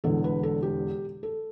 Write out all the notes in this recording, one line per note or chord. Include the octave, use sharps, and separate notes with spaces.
E1 E2 D3 A4
B4
A4
G4
A4